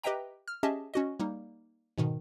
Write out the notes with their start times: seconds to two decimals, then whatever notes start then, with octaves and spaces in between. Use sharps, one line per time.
0.03 G4 B4 D#5 E5 G5 A#5
0.48 F6
0.63 C#4 G4 G#4 D#5 E5 A5
0.94 C#4 F#4 D#5
1.20 G3 A#3 D#4
1.98 G#2 B2 D#3